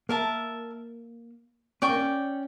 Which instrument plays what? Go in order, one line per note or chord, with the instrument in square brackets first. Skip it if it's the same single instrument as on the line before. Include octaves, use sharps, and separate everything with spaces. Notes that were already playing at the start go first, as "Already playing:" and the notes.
[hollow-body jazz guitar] A#3 [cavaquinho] A#4 E5 A5
[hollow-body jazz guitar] C#4 [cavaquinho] D5 G5 C#6
[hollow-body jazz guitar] A#3
C#4